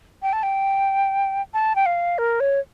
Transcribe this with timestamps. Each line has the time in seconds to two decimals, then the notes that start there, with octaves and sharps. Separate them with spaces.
0.23 G5
0.33 A5
0.43 G5
1.54 A5
1.76 G5
1.86 F5
2.18 A#4
2.40 C#5